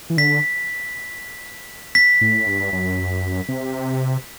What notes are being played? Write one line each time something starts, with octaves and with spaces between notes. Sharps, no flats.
E3
D3 B6
B6
A2
G2
F#2
C3